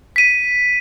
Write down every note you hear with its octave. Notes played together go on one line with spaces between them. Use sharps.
B6 D#7